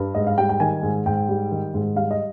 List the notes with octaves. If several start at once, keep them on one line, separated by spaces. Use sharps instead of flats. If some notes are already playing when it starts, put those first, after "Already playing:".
Already playing: G2
G#2 D#5
F5
G3 G5
G5
D#3 G#5
G#2
G#2 G5
G3
D#3
G#2
G3 F5
D#5